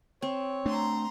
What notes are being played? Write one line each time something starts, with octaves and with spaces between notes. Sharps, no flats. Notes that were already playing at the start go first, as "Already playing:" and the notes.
C4 C#5
A3 D4 A#5 C6